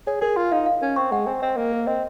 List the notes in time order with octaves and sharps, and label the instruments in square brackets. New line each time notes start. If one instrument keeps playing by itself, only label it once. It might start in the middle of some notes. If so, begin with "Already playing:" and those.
[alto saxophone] G#4 [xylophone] C#5
[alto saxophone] G#4 [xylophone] A#4
[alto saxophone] F4 [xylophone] C6
[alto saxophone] D#4 [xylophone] F5
[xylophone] F5
[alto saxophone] C#4 [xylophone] A#4
[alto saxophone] C4 [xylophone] C#6
[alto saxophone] G#3 [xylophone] F#5
[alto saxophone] C4 [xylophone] G#5
[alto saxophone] C4 [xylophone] D#5
[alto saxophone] A#3 [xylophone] D#5
[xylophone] A#4
[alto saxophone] C4 [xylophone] D#5